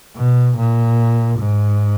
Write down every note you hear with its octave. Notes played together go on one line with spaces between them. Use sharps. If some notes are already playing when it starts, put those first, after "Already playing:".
B2
A#2
G#2